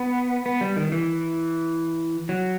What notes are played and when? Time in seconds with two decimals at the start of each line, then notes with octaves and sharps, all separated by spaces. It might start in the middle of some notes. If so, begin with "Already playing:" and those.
Already playing: B3
0.46 B3
0.61 G3
0.76 D#3
0.92 E3
2.29 F#3